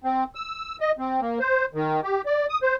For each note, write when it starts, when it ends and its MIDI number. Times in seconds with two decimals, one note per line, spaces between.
0.04 0.24 60
0.35 0.76 88
0.81 0.91 75
0.98 1.20 60
1.21 1.39 58
1.40 1.65 72
1.74 2.01 51
2.03 2.22 67
2.26 2.46 74
2.49 2.59 87
2.62 2.76 72